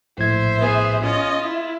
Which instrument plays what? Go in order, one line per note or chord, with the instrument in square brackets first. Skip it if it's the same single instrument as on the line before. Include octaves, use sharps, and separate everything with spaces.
[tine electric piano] A#1 A2 G#6 [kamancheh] C5 E5
[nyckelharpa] B3 G#4
[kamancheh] C#4 D#5 [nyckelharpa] F4
[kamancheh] E4